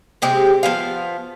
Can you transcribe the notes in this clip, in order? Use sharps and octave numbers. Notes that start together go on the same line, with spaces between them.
C3 G#3 C4 G4
F3 B3 F5